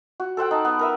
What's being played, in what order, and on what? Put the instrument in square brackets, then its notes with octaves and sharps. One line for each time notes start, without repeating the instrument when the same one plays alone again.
[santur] F#4
A4 C5 F#5 G5
D#4 A5
B3
A#4 B4 E5